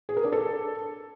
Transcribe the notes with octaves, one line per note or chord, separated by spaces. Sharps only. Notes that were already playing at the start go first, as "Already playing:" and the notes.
G#4
A#4
D4
A4